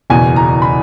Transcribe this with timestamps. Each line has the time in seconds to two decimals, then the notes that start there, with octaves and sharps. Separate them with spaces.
0.10 F#1 E2 B2 G#5
0.36 A#5
0.62 B5